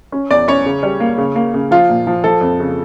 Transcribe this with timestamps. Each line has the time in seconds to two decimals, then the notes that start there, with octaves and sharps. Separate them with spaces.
0.12 C#4
0.31 E2 D5
0.48 C#4 C#5
0.66 C#3
0.83 G3
1.00 A#3
1.18 C#3
1.35 A#3
1.54 C#3
1.71 F3 F4
1.89 A#2
2.07 F3
2.24 F3 A4
2.41 F2
2.59 C#3